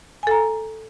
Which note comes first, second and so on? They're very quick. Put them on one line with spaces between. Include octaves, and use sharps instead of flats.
G#5 A4 A#5